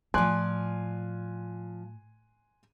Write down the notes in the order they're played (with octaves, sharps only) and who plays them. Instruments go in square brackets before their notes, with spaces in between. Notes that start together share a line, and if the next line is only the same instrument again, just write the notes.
[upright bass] A2 [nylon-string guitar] F3 D5 [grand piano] G#5 C6 F#6